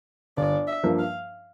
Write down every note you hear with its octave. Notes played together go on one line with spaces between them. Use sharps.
G1 D5
E5
G2 F3 A#3
F5